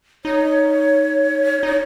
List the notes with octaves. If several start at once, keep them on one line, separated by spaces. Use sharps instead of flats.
D#4 C#5
D#4